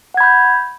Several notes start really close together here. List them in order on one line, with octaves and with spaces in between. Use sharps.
F#5 G#6 B5 G6